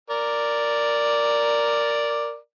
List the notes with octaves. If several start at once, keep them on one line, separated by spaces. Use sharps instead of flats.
A#4 D5